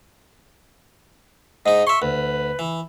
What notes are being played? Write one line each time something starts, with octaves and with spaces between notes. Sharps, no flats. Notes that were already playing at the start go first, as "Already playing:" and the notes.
G#2 D#4 D#5
E5 C6 C#6
D2 B4
E3